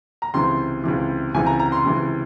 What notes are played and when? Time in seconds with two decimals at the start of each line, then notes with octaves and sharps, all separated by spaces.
0.22 A#5
0.34 C#2 C3 E3 C6
0.84 C#2 C3 E3
1.34 C#2 C3 E3 G#5
1.46 A#5
1.59 A#5
1.72 C6
1.84 C#2 C3 E3